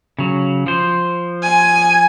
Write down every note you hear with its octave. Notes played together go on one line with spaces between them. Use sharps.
C#3 F#3
F3 C5
G#5